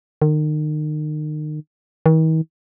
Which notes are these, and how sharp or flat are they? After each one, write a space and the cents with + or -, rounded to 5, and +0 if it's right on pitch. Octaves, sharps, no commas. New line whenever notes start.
D#3 -35
D#3 +45